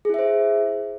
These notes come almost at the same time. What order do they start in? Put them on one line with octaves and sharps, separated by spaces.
G#4 E4 E5 C5